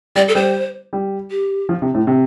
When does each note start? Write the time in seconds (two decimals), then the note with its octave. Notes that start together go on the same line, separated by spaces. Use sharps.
0.16 G3 D5
0.28 A4
0.35 G3 C5
0.93 G3
1.31 G4
1.69 F3
1.82 C3
1.94 A2
2.07 C3